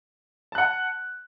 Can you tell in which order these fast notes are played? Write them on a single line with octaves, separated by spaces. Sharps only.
A5 F#6 F#5